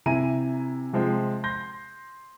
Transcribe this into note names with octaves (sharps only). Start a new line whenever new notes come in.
C3 E4 G#5 A#5 D#7
C3 F3 G#3 C4
C6 G6 A#6